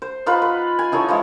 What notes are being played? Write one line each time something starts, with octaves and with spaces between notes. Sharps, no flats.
C5
D#4 F4 B4 F#5
B4
G#5
E3 D#4 A4 C#5
E3 F3 G#3